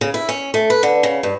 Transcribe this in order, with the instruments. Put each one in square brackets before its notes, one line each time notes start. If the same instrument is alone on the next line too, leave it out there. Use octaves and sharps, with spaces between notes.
[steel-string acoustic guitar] C#3
E4
C#4
A3
B4
D3
C#3
G2